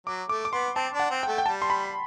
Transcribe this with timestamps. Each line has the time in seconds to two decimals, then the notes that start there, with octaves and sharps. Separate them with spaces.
0.07 F#3 D6
0.29 A3 D6
0.45 D6
0.53 B3 C6
0.75 C4 A5
0.94 D4
1.00 F#5
1.10 C4
1.23 G5
1.28 A3
1.38 G5
1.46 G3 A5
1.62 C6
1.70 B5